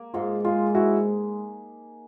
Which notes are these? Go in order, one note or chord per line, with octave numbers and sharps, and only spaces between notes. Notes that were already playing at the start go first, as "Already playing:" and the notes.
Already playing: A#3
G#2 F4
G#3 F4
G#2 E4 F#4